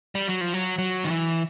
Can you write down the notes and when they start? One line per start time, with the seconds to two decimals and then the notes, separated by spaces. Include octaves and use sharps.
0.15 G3
0.28 F#3
0.41 F3
0.54 F#3
0.79 F#3
1.04 D#3
1.10 E3